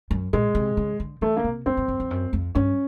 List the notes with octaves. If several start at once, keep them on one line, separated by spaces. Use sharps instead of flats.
F#2
A#2 G#3
C3
C#3
D3
E3 A3
C#3 A#3
C3
F#2 C4
F#2
F#2
F2
F#2
F2
G2 C#4